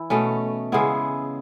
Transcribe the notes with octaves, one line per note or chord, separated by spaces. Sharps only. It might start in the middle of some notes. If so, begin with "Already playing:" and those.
Already playing: E3 E4
B2 A3 C#4
C#3 G#3 B3 E4